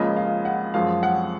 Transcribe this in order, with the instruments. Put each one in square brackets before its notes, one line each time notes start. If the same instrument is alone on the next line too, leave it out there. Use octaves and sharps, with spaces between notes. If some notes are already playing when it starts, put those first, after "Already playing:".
Already playing: [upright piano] C#2 C#3 F3 A#3 D#5
F5
F#5
F#2 F3 G#3 F5
F#5